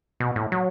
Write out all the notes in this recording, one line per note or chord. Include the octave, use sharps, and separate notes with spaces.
B2
A2
F#3